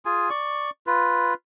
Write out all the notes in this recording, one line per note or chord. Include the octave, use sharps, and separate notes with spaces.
F4 G#4 G#5
D5 C#6
F4 B4